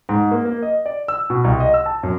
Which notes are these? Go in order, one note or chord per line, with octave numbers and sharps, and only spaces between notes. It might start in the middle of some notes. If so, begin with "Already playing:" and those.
G#2
A#3
A#3
D#5
D5
E6
B2
C2
D#5
E6
A5
F#2